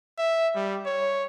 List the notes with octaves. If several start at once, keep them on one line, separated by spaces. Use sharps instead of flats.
E5
G3
C#5